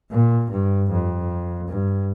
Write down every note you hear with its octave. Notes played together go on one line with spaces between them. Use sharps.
A#2
G2
F2
G2